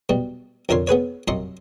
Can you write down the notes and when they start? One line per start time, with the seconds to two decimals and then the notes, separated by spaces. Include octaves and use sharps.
0.09 B2 G3
0.69 F2 D3 A#4 C#5 C6
0.87 B3 G#4 B4 C#5
1.28 C2 F#2 D#5 C6 C#6